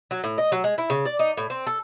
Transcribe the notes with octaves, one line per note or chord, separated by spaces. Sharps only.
F#3
A2
D#5
F#3
G#3
E4
C#3
D5
D#4
A2
C4
A4